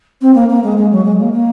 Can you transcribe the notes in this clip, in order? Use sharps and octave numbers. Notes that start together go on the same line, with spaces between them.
C4
A#3
A#3
G#3
G#3
F#3
G#3
A#3
A#3